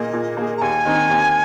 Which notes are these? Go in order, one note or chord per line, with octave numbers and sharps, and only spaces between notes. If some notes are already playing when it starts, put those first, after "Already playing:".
Already playing: A#2 A#3 G#4 D#5
A#2
A#3 G#4
A#5
D#2 G#5
D#3 C4 D#4
D#2